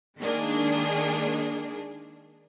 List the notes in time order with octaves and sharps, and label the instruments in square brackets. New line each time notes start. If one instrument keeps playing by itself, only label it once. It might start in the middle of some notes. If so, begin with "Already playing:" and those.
[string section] D#3 G#3 A#3 D4 G#4